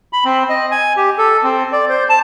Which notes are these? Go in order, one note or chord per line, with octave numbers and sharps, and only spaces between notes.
B5
C4
D#5
G#5
G4
A4
C4
D5
C5
A5